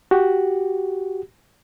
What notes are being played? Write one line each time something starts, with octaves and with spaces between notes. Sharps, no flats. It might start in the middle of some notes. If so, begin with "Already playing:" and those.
F#4 G4